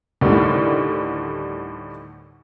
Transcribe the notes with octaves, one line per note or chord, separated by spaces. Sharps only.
D2 A2 D3 D#3 G3